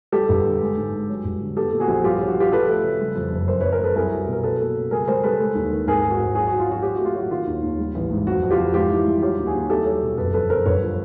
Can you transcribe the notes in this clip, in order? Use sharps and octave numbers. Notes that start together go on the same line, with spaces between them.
G3 G4 A4
G1
D3
G#3
G#2
G#3
F#3
G1
D3
B3 G4 A4
A#2
F#4 G#4
A#1
G2 F4 G4
F#3
F#4
F#3 F4 G4
F3 A4 B4
A3
C#3
G3
F2
F#1
F#2 A#4 C5
F#2 B4 C#5
A#4 C5
F#2 A4 B4
C2 G#4 A#4
F#3
B2
A#4
F#3 A4 B4
A#3
C#3
G3 G#4 A#4
G3 A#4 C5
G3 A4 B4
G#3
D#2
D#3
G#1 G#4 A#4
G#2
F#4 G#4
G#1
F#3 F#4 G#4
F#4
F#3
F4
F#3 F#4
F#3 G4
A3 F#4
F4
F#3 F#4
D#3 F4
D#2
D#2
G3
A1
G#2
F2 F#4
F2
F4 G4
F2
G#2 F4 G4
E3
G3
F#3 F4 G4
D#2
F#4 G#4
D#2
C2 G4 A4
F#3
B2
F#1 A4 B4
F2 A4 B4
F#1 A#4 C5
G1 B4 C#5
F3